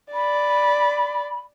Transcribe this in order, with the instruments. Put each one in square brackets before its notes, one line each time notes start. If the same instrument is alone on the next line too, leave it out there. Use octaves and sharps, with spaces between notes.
[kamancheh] D5 [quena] B5